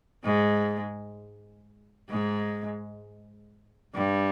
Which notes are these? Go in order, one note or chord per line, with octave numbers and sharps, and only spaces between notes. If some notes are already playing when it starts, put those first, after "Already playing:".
G#2 G#3
G#2 G#3
G2 G3